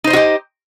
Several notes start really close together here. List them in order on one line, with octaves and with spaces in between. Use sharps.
D#4 C5 D#5 F#4 G4